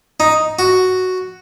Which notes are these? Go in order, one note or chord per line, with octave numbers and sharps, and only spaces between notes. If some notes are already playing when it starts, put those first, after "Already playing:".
D#4
F#4